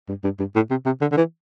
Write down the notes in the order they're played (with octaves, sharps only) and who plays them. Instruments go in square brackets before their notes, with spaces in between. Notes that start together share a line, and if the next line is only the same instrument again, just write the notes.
[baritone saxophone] G2
G2
G2
A2
C3
C3
D3
D3
E3